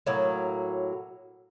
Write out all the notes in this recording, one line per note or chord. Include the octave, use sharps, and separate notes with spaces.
A2 F#3 A#3